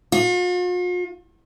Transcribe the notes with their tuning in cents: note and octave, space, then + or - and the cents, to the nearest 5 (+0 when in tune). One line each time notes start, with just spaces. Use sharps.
F4 +45